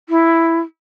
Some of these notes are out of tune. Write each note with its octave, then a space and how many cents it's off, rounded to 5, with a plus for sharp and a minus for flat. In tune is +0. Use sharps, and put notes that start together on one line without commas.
E4 +5